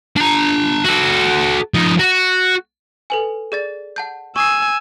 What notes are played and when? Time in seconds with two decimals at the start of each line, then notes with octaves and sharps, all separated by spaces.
0.17 D4 A#5
0.84 F#4 A4
1.74 F3 D#4
1.99 F#4
3.10 A4 B4 G#5
3.52 G#4 D5 A6
3.96 F#5 A5 G6
4.36 G#5 C#6 D#6 E6 C7